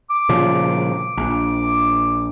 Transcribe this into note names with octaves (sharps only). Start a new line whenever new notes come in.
D6
A#2 C#3 F3
A#1